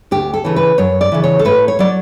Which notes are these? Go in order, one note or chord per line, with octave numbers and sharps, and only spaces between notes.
D2 G4
A4
C#3 E3
B4
F#2 C#5
D5
C#3 E3
C#5
A4
A2 B4
C#5
F#3 D5